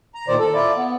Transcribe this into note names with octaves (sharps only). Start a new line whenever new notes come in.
A#5
A#2 D#3 C5 D5
A4
E4 F4 D5
B3